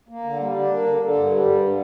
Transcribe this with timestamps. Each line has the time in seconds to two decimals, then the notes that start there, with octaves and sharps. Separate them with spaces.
0.09 A#3
0.24 D3
0.39 G3
0.54 D4
0.70 A#3
0.85 D3
1.00 D3
1.16 G2
1.31 G3
1.46 G2
1.61 D3